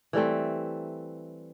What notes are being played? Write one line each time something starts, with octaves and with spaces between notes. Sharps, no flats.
E3 G3 A3 C4